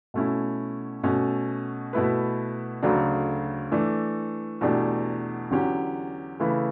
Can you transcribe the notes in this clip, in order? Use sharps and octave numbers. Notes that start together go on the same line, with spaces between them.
B2 A3 C#4 E4
B2 A3 C#4
B2 A3 E4 B4
D2 C#3 F#3 A3 D4
E3 A3 D4
E2 B2 A3 D4 G4
E2 D3 F#3 C#4 G4
C#3 E3 A3 E4 B4